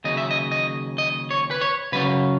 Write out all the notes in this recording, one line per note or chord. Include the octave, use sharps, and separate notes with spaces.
D#2 C#3 F#3 D#5
E5
D#5
D#5
D#5
C#5
B4
C#5
C#3 F#3 C#4 B4